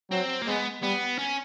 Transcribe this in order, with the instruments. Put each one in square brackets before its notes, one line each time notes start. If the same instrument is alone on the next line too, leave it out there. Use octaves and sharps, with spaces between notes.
[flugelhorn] F#3 [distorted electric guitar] C4
[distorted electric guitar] A#3
[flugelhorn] G#3 [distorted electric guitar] B3
[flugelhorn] G3 [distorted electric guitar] B3
[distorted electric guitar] C#4